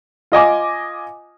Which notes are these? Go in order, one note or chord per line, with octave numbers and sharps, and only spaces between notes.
F4 D#5 G#5 D6